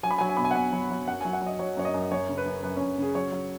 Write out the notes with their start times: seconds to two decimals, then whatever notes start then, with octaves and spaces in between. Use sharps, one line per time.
0.03 F#3 G#5
0.11 B5
0.18 F#3 G#5
0.29 G#5
0.37 B2 B5
0.45 G#5
0.51 F#5
0.55 B2 G#5
0.73 F#3
0.91 F#3
1.07 F#2 F#5
1.21 F#3 G#5
1.33 F#5
1.42 F#3 D#5
1.59 F#3 C#5
1.77 F#2 C#5
1.85 D#5
1.94 F#2
2.11 F#2 C#5
2.29 C#3
2.38 B4
2.46 F#2
2.63 F#2 B4
2.76 F#2 C#4
2.98 C#3 G#4
3.15 F#3 C#5
3.32 F#3